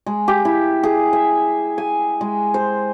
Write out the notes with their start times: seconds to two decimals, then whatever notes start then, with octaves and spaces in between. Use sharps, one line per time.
0.06 G#3
0.28 G4
0.45 E4
0.83 G#4
1.13 E5
1.78 G#5
2.21 G#3
2.54 C5